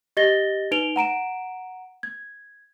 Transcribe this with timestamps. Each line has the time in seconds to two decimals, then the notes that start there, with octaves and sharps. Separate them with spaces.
0.17 G4 D#5 A6 A#6 G7
0.71 D#4 B4 D7 F7 G7
0.96 F#5 A#5 D7 E7
2.03 G#6